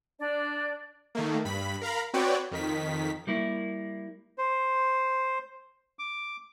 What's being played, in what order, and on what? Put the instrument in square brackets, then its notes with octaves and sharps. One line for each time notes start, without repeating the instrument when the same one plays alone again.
[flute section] D4 D5
[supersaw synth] D#3 A3 A#3
G2 B5 B6
A#4 F5 A#5 B5
C4 F#4 B4 C#5 D5 G5
F2 D#3 B6
[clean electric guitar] G3 A#3 E4
[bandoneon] C5
D6